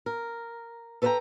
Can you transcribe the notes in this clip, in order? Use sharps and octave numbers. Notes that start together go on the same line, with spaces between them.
A#4
A4 B4 C5 F#5 G5 A#5